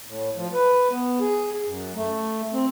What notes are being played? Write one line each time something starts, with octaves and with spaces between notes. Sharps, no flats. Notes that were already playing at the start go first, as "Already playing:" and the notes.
A2
F3
B4
B3
G#4
F#2
A3
C4